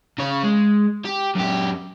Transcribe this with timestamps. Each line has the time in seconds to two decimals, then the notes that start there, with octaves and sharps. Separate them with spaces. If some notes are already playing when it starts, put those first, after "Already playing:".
0.19 C#3 C#5
0.44 G#3
1.05 G4
1.35 F#2 G4